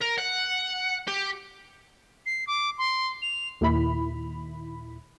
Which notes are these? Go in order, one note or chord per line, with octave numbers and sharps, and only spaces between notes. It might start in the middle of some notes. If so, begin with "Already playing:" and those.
A#4
F#5
G4
C7
D6
C6
F7
D#2 A#2 D#3 E4 B5